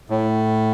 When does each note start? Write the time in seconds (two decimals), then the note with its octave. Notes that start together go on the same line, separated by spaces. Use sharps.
0.10 A2